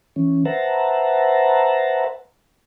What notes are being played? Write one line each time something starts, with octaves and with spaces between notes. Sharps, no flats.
E3 C#4
B4 C5 E5 F#5 A5 A#5